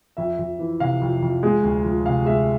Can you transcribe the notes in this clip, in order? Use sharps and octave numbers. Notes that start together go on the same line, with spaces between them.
F2 E5
F2
E3
C3 F5
F2
F2
G#3
D2
F3
C3 F5
G#3 E5